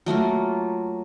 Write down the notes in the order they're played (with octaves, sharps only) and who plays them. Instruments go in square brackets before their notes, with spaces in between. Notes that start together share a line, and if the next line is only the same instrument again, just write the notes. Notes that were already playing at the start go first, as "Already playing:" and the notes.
[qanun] F#3 A3 A#3 F4